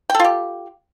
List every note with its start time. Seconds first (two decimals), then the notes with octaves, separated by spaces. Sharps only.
0.10 G5
0.14 A4
0.19 F4
0.24 G4